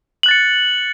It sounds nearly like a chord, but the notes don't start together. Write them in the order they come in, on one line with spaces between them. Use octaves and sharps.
F#7 F#6 A6 C#7